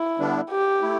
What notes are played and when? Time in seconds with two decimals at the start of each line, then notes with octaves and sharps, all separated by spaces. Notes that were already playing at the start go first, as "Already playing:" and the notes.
Already playing: E4
0.19 D3 G3 B3 D4
0.50 G4
0.81 A3 E4